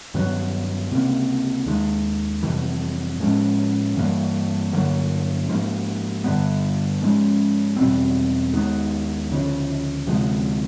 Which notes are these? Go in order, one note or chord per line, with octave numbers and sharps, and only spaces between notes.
G2 D#3 F#3 B3
C#2 C3 F3 A#3
D#2 D#3 G#3
F2 C3 E3 G3
A2 F3 G#3 C#4
G2 E3 G3 A#3
G2 D3 F#3 A#3
G#2 F3 A#3
G2 D3 G3 B3
G#2 F3 G#3 C#4
E2 B2 G3 C4
D#2 D#3 G#3 B3
D2 C#3 F3
D2 C3 F3 G#3